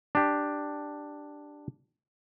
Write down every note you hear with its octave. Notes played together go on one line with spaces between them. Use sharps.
D4 G4